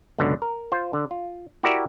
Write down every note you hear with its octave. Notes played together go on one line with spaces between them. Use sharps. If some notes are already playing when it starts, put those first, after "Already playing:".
C#2 F#2 B2 D3
A#4
F4 C5
D3
F4
E4 F#4 G4 A#4 D5 E5